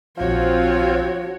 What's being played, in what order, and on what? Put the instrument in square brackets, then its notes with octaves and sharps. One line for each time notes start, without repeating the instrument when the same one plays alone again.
[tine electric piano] A#1 F5 [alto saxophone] F3 [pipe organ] C4 F4 [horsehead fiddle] F#4 C#5